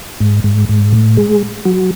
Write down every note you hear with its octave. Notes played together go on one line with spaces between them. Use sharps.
G#2
G#2
G#2
A2
G#3
F#3